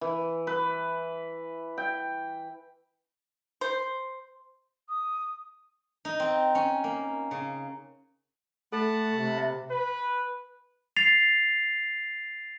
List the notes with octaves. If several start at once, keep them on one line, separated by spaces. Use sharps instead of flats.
E3
B4
G5
C5
D#6
D#4
C4
C#4
A#3
C#3
A3 A4 F#5 A5 B5
C3
E5
B4
A6 C7 F7